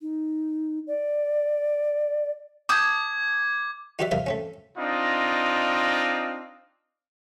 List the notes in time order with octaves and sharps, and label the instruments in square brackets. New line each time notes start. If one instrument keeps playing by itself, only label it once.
[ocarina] D#4
D5
[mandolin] A5 D#6 G6 [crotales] D6 G#6
[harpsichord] D#4 F#4 G4 B4 D5 E5
G2 C3 D4 A#4 E5 F5
A3 C4 C#4
[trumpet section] C4 D4 D#4 F4 D#5